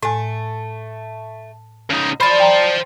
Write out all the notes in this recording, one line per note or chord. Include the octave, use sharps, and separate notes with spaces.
A2 A3 G#5
C#3 D#4
C5 D5 F5 A5 B5
G5 A#5